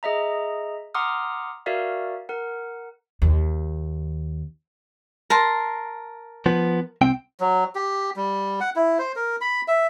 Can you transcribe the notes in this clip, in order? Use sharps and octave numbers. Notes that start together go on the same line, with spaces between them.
G#4 D#5 E5 A#5
F#5 A#5 C6 D6 D#6 F6
F#4 A#4 D5 E5 F5
A#4 F#5
D#2
A#4 A5 C6
F3 B3
C2 C4 G5
F#3
G4
G3
F#5
E4
C5
A#4
B5
E5